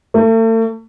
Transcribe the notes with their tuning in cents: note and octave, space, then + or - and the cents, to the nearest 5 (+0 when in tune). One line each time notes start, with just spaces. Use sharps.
A3 +40